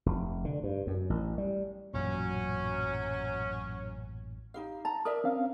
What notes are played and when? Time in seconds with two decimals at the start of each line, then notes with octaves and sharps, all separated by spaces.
0.06 F1
0.45 D3
0.64 G2
0.87 F#2
1.10 A1
1.38 G3
1.94 A1 F#2 A#2 F#3 C#4
4.54 D#4 G4 F5
4.85 A5 A#5
5.05 A#4 D5 E5 D#6
5.24 C4 C#4 F5